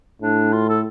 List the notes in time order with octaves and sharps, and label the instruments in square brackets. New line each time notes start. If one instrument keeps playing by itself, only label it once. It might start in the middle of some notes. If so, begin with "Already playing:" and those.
[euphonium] A2 [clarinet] D4
[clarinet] F4
A4